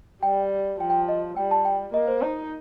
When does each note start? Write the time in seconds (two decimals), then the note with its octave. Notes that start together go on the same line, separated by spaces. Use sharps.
0.23 G3 G5
0.80 F3 G5
0.90 G5
1.08 D#5
1.37 G3 G5
1.51 A5
1.65 G5
1.93 A#3 D#5
2.08 C5
2.22 D#4